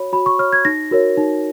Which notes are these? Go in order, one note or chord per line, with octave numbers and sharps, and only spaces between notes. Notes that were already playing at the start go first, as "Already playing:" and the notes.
Already playing: F#4 C#5 B5
F#4 B5
C#6
C#5 F6
G#6
D#4 A#6
F#4 A#4 C#5
D#4